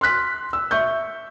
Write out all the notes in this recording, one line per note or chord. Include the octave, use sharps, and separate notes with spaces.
C6 F6 F#6 B6
E6
E5 C#6 G6